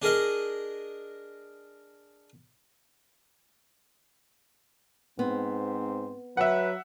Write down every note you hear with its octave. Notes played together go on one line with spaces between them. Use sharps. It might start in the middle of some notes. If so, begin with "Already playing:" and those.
D4 G#4 A#4 D#5
G#2 B3 C4
F#3 B4 E5 F#5